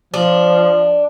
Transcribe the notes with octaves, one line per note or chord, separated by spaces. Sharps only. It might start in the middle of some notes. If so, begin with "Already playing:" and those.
F3 D4